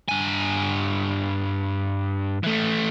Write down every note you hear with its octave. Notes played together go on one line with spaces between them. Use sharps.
G2 G#5
E3 A3